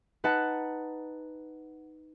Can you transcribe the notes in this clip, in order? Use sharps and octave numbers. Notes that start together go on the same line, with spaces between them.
D#4 B4 F#5 A5